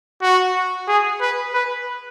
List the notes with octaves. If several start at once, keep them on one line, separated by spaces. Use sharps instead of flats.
F#4
G#4
B4
B4